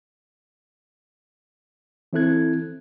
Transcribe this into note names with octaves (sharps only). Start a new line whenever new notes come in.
E3 C4 E4 A4 F#6 G#6